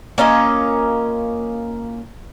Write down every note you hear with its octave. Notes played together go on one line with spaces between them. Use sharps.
A#3 C#4 F4 D#5